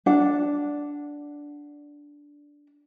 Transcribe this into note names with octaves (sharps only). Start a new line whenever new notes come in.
D4 D5 F#5